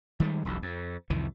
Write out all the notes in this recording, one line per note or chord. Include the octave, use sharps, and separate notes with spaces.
D#3 G3 G#3
E1 B1 F2
F2
C2 F2 D#3 E3